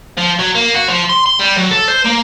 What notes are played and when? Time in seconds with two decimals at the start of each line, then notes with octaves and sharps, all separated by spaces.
0.17 F3
0.39 F#3
0.55 A#3
0.74 F#4
0.88 F3
1.09 C6
1.26 C6
1.39 G3
1.56 F#3
1.71 A4
1.88 C5
2.06 A#3